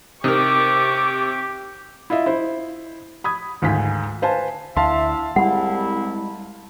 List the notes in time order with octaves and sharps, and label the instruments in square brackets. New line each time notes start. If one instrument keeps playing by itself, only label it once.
[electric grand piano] C3 [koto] D#4 A#4 [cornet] G4 [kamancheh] C#6 D6
[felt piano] E4 F4 D#5 E5
E4 C5
B5 D#6 G#6
D2 G#2 D#3 F4 G#5 B6
B4 C5 F5 G#5 A5
[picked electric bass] D2 [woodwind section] E4 E5 [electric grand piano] F5 A5 C6
[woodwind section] C2 C4 E4 [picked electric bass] G3 G#3 [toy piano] F#5